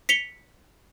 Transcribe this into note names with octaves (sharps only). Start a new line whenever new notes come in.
B6 C#7 F7 G7